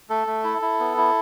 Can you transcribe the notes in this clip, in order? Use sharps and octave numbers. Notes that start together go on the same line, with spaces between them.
A3 A4
A3
E4
E4
B3
E4